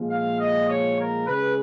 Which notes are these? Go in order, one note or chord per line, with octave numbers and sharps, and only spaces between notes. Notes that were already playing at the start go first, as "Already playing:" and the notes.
Already playing: A#2 F3 G#3
F5
D#5
C#5
A#4
C#3 G#3 B4